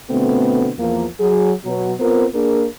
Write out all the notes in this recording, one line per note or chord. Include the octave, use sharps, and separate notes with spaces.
B2 D3 A3 B3 C4
E2 F3 A#3
F#3 G#4
B2 F#3
B3 C4 F4 A#4 C5
A#3 D4 G#4 A#4